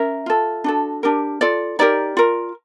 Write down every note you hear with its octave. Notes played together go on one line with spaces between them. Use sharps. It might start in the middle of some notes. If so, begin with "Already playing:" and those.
Already playing: C#4 A#4 E5
F4 A4
D4 F#4 A4
D4 G4 A#4
F4 A4 D5
D#4 G4 A#4 D5
F4 A#4